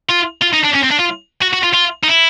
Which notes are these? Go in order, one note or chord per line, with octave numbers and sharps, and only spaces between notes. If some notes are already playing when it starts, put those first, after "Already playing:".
F4
F4
D#4
D4
C#4
C4
D4
F4
F#4
F#4
F4
F4
D#4
E4